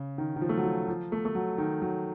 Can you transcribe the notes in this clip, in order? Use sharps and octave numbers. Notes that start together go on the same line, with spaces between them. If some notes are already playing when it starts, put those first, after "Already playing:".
Already playing: C#3
D#3
D#3
F3
A3
F#3
F3
F3
A3
A3
F#3
D#3
F#3